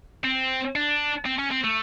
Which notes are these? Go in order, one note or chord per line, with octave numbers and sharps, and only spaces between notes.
C4
D4
C4
C#4
C4
A3